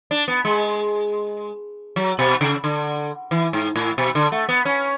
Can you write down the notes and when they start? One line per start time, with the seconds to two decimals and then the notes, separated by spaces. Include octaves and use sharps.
0.11 D4
0.28 B3
0.45 G#3
1.96 F#3
2.19 B2
2.41 C#3
2.64 D3
3.31 E3
3.53 G#2
3.76 A2
3.98 B2
4.15 D3
4.32 A3
4.49 B3
4.65 C#4